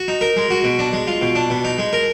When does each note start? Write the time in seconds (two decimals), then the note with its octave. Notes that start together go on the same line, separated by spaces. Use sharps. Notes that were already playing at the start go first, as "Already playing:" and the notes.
Already playing: F#4
0.08 D#4
0.21 A#4
0.37 G#3
0.51 F#4
0.64 B2
0.79 D4
0.93 G#3
1.07 F4
1.22 B2
1.35 D4
1.50 B2
1.65 D#4
1.78 G#3
1.93 A#4